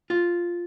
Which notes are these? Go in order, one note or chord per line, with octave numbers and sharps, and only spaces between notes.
F4